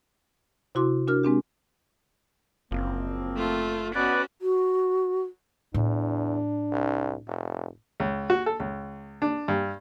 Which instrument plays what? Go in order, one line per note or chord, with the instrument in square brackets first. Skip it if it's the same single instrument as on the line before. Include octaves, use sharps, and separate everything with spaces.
[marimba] C3 E4 F#4 C6 D6
D4 F#4 A#4 F6
G#3 C4 D4 G4
[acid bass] F#1 [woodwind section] F3 A#3 C4
[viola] A3 F4
[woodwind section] B2 B3 [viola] C#4 F#4 [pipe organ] B4 D5
[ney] F#4
[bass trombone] E2 [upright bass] A2 F4 [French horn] D4
[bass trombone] C2
F1
[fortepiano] C#2
F#4
A4
C#2
D4
G2